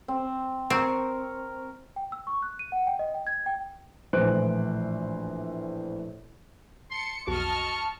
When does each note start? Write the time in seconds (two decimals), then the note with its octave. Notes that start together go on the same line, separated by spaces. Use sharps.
0.08 C4
0.70 C4 A#4 C#6
1.96 G5
2.12 E6
2.27 C#6
2.42 F#6
2.59 D#7
2.72 F#5
2.87 G5
2.99 D#5
3.14 G5
3.27 G#6
3.46 G5
4.13 A#1 A2 E3 C5 F#6 D7
6.90 A5 C6 C#7
7.27 B1 F2 F#4 D#5 A5 C#6 F6